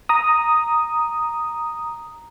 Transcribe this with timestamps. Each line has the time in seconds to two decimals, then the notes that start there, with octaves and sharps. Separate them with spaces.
0.09 A#5 D#6